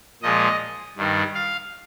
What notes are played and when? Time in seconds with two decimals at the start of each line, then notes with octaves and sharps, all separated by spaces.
0.22 A#2 F3 G#3 D#5
0.96 G2 D#3 G3
1.34 F5